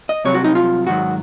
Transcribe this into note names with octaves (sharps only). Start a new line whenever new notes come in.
D#5
C2 C3 F#3 C#5
F#4
D#4
F4
G#2 D#3 F#3 F#4